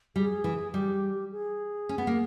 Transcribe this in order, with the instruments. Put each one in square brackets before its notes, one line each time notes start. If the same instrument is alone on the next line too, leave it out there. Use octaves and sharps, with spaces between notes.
[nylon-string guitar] G3 [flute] G#4
[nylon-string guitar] E3
[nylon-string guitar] G3 [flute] G4
[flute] G#4
[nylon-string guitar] C#4
B3
A#3